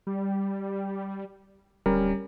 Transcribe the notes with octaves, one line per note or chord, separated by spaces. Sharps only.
G3
D1 G3 C#4 A#4